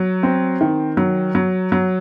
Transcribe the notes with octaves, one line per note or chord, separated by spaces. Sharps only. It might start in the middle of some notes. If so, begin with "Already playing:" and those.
Already playing: F#3
C4
D#3
F#3
F#3
F#3